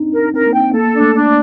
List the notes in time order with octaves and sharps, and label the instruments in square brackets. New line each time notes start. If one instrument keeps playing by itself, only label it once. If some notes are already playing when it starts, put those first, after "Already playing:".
Already playing: [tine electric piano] C4 D4 D#4
[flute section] A#4
[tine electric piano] C4 [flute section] A#4
[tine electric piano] A#3
[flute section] G5
[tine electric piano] C4
[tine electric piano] A#3 [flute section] A4
[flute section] D4
[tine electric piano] A3
[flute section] D4